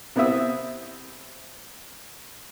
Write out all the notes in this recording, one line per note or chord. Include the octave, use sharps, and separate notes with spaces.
C3 B3 C4 E4 E5 D#6